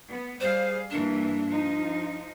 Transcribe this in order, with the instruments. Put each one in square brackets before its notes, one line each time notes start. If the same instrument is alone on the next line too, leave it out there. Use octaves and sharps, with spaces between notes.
[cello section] B3
[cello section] G3 G#4 F5 [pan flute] C5
[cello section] G2 E3 A#3 [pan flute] D4
[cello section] F3 D#4